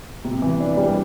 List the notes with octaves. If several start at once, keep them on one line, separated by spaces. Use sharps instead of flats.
C3
E3
D4
G3